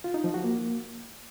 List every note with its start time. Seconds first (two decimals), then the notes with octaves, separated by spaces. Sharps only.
0.04 F4
0.14 D#4
0.24 F3
0.34 F#4
0.44 A#3